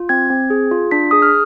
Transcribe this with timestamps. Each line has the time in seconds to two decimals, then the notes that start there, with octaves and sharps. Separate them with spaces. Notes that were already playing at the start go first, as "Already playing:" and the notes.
Already playing: F4
0.09 C4 G#6
0.30 C4
0.50 G#4
0.71 F4
0.91 D4 B6
1.11 G#4 D#6
1.22 F6